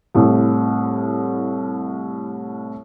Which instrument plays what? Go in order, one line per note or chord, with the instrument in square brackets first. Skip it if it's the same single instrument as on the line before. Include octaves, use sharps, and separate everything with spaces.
[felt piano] C2 A2